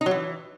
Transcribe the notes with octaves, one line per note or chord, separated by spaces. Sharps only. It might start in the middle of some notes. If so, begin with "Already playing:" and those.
D#4
F#3
E3